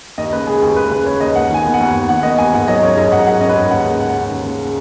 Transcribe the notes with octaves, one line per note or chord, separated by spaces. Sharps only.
D#2 D#5
C#3 B4
G#3 G#4
D#2 G#4
D#2 B4
C#3 B4
G#3 C#5
D#2 D#5
D#2 F#5
D#3 G#5
B3
F#5
D#2
D#2
D#3 F#5
B3 D#5
D#2 G#5
G#2 F#5
F#3 D#5
C#4 C#5
G#2 D#5
G#2 F#5
F#3 F#5
C#4 D#5
B4
G#2 C#5
D#2 F#5
C#3
G#3 F#5
C#4
D#2
C#3
G#3